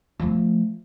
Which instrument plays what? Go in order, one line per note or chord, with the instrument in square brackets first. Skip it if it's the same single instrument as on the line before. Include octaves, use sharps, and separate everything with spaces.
[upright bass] F3 A3